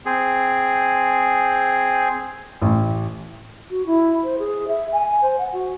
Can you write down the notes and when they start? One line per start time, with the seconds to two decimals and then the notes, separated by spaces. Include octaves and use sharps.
0.06 C4 G#4
2.62 A1
3.70 F#4
3.86 E4
4.23 C5
4.39 G#4
4.68 E5
4.92 G#5
5.22 C5
5.38 F#5
5.53 F#4